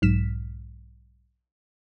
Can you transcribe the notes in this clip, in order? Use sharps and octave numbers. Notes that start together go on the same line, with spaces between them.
B1 G#2 F6 B6 E7